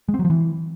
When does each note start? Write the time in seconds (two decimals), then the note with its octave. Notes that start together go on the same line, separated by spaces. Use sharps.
0.09 G#3
0.14 C4
0.19 F#3
0.25 F3
0.30 E3